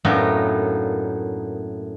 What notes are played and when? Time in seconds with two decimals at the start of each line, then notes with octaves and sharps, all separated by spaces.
0.05 F#2 A2 A#3 B3 D4 D#4